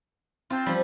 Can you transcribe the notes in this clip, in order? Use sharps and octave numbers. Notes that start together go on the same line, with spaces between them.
C4 F4 A5
F3 G3